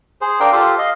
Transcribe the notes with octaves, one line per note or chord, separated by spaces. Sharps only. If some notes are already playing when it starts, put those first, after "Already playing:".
G#4 C5
D4 A#4 F5 G5
F4 G4 A4 C5
D#5 F5